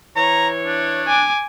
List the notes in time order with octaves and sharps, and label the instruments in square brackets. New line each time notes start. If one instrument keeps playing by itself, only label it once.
[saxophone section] E3 C#5 [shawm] A#5
[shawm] D4
[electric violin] G#5 D6